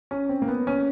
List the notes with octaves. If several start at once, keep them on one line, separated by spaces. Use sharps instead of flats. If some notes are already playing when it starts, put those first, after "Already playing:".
C#4
C4
A#3
B3
C#4